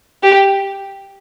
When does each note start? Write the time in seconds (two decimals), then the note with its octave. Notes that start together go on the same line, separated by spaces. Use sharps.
0.23 G4